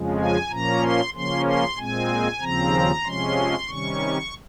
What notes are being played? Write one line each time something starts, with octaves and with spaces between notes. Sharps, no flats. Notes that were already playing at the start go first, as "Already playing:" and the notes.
Already playing: F2 C#3 F3 G#3
G#5
A#2 F3 A#3 C#4 A#5
C6
C#3 F3 A#3 C#4 C6
C6
A#2 G#3 C4 G#5
D#2 C#3 F3 C4 A#5
C3 F3 G#3 C#4 C6
C3 D#3 G3 C#4 C#6